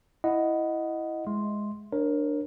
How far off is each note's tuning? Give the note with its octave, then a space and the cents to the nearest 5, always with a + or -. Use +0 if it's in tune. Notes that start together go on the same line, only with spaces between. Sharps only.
E4 +0 D#5 +0 F#5 +0
G#3 +0 E5 +0 C6 +0
D4 +5 A#4 +10 C#5 -30